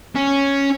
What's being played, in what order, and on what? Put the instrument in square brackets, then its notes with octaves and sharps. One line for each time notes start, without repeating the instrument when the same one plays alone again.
[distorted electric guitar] C#4